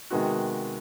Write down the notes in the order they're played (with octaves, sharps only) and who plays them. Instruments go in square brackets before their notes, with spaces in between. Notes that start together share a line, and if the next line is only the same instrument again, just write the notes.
[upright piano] C3 D#3 G#3 B3 F#4 F#5